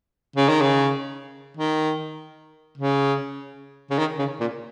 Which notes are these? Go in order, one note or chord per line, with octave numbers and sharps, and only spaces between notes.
C#3
D#3
C#3
D#3
C#3
C#3
D#3
C#3
A#2